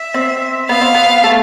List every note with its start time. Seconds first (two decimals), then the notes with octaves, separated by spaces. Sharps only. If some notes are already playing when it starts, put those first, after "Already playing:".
Already playing: E5
0.14 C4
0.69 B3 F5
0.81 C4
0.95 B3
1.24 A3